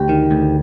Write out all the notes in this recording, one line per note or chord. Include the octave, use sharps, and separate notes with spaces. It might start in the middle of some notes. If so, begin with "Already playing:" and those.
Already playing: D2 G4
D#3
D2